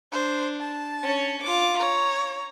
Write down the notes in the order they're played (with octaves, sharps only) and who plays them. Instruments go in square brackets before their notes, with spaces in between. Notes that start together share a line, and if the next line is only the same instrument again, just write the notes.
[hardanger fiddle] D4 [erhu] C5
[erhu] A5
[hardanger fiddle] C#4 C#5
F4 D6
[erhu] C#5 [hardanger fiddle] A#5